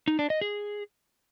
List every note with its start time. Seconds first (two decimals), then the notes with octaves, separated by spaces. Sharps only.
0.08 D#4
0.19 D4
0.30 D#5
0.41 G#4